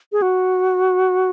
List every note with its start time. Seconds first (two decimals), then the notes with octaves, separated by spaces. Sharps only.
0.12 G#4
0.22 F#4